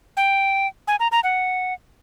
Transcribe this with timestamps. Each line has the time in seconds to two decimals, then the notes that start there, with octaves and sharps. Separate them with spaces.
0.17 G5
0.88 G#5
1.00 A#5
1.12 A#5
1.24 F#5